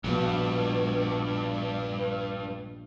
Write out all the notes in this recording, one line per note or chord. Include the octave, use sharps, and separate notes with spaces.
A#1 G2 B2